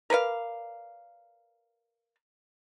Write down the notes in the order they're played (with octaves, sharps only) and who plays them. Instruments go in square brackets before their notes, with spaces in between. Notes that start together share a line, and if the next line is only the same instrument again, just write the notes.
[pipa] A#4 B4 D5 F5